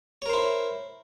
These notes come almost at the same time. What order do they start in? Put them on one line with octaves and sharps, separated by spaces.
C#5 A#4 C5 E4